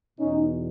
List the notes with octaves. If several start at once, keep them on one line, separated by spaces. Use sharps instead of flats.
E2 B2 C#4 D#4